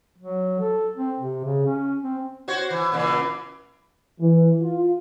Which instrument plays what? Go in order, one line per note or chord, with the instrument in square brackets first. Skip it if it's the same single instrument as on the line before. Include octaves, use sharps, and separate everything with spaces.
[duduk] F#3
A4
C4
C3
C#3
C#4
C4
[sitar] F#4 C5 C#5
E3
A#2 C#3 E3
[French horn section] E3
F4